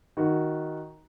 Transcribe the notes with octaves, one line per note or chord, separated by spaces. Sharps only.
D#3 F#4